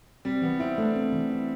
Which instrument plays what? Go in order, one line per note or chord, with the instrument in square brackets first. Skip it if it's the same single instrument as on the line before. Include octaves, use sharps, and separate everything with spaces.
[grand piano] G3 [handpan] C4
[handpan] E3 [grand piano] B3
[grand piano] C4 [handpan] E4
[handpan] A3 [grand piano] D4
[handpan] C4
E3
E4